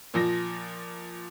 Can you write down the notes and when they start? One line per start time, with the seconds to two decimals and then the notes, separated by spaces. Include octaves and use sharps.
0.14 A#2 F3 A#6